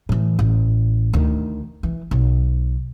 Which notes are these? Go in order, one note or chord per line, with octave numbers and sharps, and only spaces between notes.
A2 E3
A1
D2 D#3
E3
B1